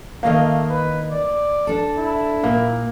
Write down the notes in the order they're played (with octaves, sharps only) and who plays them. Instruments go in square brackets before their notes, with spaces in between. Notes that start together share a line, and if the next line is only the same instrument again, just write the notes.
[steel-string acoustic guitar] D#3 D#5 F5 [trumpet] A3 [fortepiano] A#3
[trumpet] B4
D5
[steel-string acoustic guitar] D4 A4
[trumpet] E4
[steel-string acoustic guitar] A#2 [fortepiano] A#3